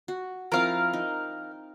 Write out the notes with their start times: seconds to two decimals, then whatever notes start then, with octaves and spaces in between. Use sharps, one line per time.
0.08 F#4
0.52 F3 C4 E4 A#4 F5
0.93 D#4